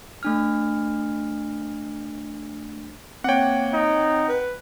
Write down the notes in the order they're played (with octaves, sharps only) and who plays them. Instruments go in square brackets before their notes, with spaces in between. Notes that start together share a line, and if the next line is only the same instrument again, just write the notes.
[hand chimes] A3 D4 F6
[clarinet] A#3 [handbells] C4 C#5 [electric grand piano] F#5 G5
[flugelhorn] D#4
[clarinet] B4